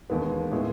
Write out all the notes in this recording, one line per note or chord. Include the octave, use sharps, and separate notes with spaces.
E1 D#2 D#3 G#3 B3
A2 E3 G#3 B3 E4